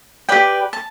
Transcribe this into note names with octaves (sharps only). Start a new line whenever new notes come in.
G4 B4 D5 G5
A5